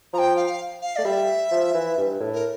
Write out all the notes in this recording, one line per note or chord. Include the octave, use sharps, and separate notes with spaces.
F3 A#5
G5
F5
F5
A3 D5
G3 E5
F3
E3
G2
A2
A#4